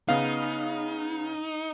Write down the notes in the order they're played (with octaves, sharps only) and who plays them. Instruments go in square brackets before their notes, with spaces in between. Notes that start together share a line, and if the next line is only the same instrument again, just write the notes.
[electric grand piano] C#3 B3 F5 [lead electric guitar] D#4